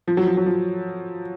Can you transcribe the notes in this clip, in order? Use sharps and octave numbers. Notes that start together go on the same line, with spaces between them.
F3
F#3
F3
F#3
F3